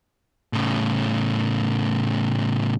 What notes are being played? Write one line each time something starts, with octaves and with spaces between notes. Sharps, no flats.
A2 C#3